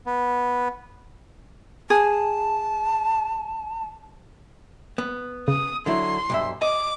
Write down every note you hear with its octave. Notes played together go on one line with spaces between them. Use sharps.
B3
G#4 A5
B3
C#3 D#6
D3 F#3 E4 C6
B1 G2 E5
D#5 D6